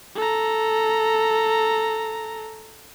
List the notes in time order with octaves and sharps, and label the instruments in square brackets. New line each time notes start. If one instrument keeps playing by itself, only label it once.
[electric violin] A4 A#5